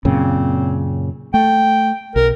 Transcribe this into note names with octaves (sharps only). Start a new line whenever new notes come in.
F#2 A#2 C#3 C4
A3 G5
B1 A#4